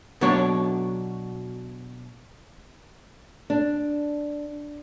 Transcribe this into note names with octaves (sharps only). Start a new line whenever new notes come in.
B2 F#3 D4 C#5
D4